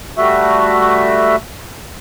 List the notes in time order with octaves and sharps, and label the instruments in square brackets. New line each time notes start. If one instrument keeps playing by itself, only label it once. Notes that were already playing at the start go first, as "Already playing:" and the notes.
[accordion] G3 A3 F#4 E5